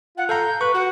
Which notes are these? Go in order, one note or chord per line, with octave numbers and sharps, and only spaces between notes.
F4 F#5
A4 F5 A#5 G6
B4 C#6
F#4 F#5